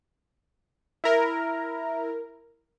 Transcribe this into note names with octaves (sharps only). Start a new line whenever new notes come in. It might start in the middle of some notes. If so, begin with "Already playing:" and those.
E4 A#4